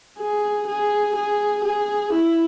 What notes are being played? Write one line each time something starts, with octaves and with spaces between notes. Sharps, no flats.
G#4
G#4
G#4
G#4
E4